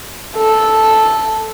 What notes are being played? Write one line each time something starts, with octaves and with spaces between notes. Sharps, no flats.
A4